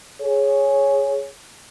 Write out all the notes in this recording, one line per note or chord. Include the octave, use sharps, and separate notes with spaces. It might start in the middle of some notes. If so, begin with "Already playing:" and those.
G#4 C#5